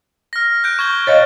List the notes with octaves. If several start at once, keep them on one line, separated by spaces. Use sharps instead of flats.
F6 A#6
F#6 G6 D7
C#6 G#6 G7
C#5 D#5 F5 A6